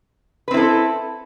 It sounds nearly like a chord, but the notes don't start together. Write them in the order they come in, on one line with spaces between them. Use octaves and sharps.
B4 C4 E4 A4